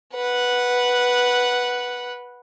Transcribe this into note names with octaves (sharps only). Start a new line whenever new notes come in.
B4 F#5